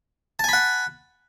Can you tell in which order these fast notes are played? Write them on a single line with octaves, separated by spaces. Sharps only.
A5 G#5 B5 F#5